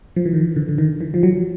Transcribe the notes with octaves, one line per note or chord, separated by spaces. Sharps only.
F3
E3
D#3
D3
D3
D#3
E3
F3
F#3